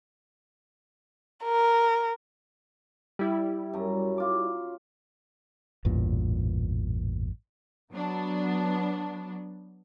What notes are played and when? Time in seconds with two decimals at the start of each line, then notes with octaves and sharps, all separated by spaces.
1.44 A#4
3.19 G3 E4
3.73 F#2 A#5
4.18 F4 D6
5.85 A1 E2 G2 A#2
7.92 F#3 B3 D4